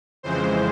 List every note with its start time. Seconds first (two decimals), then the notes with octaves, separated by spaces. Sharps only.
0.23 F2 C#3 E3 G#3 C5